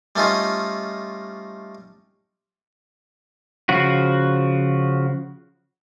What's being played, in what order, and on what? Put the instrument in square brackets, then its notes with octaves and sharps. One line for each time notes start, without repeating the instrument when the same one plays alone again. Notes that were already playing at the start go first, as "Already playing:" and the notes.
[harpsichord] G3 A3 C#4 D#4 F4
[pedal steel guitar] C#3 F3 F#4